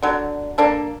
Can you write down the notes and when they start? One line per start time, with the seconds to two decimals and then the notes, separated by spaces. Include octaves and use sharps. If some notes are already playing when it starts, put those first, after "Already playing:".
0.02 D3 F#3
0.58 A#3 D4 A4